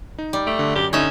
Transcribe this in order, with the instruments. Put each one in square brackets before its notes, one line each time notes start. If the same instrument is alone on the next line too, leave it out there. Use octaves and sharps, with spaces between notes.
[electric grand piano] D#4
[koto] G3
[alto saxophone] A3 [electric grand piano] D7
[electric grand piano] D3
[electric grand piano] F#2 [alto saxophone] G4
[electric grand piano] D3 [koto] C#4 E5 [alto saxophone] D#4